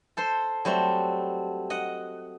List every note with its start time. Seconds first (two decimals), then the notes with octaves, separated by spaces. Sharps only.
0.17 A4 C5 C6
0.65 F#3 G3 A3 C4
1.70 D#5 F#5